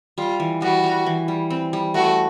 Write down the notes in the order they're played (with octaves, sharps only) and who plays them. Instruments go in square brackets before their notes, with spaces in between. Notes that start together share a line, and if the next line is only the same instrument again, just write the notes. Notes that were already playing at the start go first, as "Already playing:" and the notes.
[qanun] G3 [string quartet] F4
[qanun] E3
[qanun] G3 [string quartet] F#4
[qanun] G3
E3
G3
C4
G3
[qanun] A3 [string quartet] F#4